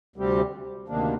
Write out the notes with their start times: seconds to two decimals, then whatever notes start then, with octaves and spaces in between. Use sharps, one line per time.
0.16 D2 C3 G3 C4 G4
0.88 D2 C3 D#3 A#3 D4